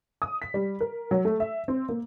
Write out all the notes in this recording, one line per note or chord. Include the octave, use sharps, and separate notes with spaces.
D#6
B6
G3
A#4
F#3
A3
E5
C4
A#3